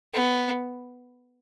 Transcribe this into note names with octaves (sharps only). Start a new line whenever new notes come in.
B3